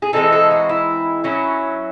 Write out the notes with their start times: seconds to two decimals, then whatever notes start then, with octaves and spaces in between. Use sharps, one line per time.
0.02 G#4
0.13 E3 G#3 C4 D#4 A4
0.32 A4
0.51 F#4
0.69 E4
1.24 F#3 C#4 E4